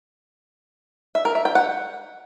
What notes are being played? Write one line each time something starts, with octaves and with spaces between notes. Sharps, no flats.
E5
A#4
E5
G5
F#5